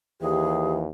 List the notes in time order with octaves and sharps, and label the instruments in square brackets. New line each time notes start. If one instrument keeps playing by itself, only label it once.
[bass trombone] D#2 [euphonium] E3 [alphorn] G4 [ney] G#4